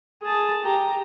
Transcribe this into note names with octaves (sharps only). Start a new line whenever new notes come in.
G#4 A5
G4 A#5